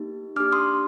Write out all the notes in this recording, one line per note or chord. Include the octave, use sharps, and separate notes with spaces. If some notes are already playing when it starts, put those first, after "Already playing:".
Already playing: A#3 D#4 G4
D4 G4 D6 F6
C6 D#6